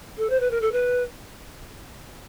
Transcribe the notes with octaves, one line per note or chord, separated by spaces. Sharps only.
A4
C5
B4
A#4
A4
B4